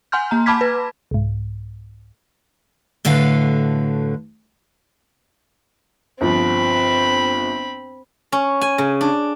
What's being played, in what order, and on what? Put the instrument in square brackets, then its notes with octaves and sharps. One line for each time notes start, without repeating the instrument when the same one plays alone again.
[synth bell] F#5 G#5 C6 F6 G6
A#3 A#5
A5 B5 D6 F6 G#6 B6
B4
[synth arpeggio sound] C2 G#2
[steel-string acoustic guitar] A2 D3 F#4 A4 B4 F5
[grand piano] G1 F3 [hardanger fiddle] C4 B5
[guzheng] C#4
G#5
C#3
D4